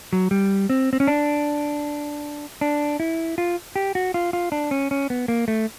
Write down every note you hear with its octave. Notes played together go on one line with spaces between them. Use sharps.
F#3
G3
C4
C4
C#4
D4
D4
E4
F4
G4
F#4
F4
F4
D4
C#4
C#4
B3
A#3
A3